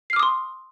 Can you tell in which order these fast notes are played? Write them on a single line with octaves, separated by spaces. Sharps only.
C7 F6 D6 D#6 C6